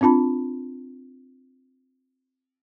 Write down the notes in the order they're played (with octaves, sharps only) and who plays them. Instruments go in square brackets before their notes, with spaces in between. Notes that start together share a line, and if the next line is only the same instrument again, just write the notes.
[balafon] C4 D4 F4 A5 B5